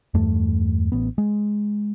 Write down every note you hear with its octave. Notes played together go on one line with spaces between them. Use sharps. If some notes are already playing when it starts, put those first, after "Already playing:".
E2 G2 A3
A1 B3
G#3